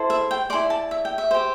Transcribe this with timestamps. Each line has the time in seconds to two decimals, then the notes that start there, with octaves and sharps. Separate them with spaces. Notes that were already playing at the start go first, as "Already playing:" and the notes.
Already playing: E4 A4 C5
0.10 E5
0.31 G5
0.50 E4 A4 D5 C6
0.70 A5
0.91 E5
1.05 G5
1.18 E5
1.31 G4 C5